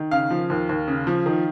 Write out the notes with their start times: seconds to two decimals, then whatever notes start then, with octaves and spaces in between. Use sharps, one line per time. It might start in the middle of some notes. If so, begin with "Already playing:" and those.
Already playing: D#3
0.11 C#3 F5
0.30 F3
0.50 D#2
0.69 D#2
0.88 C#3
1.07 F3
1.26 D#3